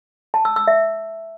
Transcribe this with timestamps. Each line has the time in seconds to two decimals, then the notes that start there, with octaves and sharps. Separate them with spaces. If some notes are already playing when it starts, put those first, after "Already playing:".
0.34 A5
0.45 E6
0.56 E6
0.67 E5